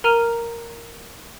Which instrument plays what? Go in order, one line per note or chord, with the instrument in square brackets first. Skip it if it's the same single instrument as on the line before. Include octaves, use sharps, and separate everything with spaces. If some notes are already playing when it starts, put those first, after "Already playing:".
[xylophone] A#4 A#5 F6 D#7 F7